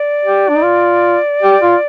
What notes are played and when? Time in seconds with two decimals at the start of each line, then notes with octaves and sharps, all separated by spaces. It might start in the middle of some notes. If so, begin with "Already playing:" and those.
Already playing: D5
0.25 G4
0.49 D4
0.56 D#4
0.63 F4
1.43 G4
1.62 F4